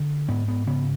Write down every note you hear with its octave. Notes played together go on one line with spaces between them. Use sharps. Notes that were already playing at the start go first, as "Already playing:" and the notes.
Already playing: D3
G#2 B3
B3
C#3 B3